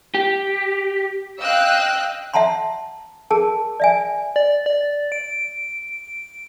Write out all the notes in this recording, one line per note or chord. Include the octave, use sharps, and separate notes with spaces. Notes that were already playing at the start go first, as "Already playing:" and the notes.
G4
D#5 F5 G5 E6 F#6
E5 F#5 A5 A#5 C6
G#4 A#4 A5
D5 E5 G#5
D5
D5
D7